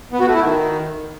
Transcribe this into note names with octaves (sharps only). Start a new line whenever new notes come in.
B3
F#4
A3
E4
D#3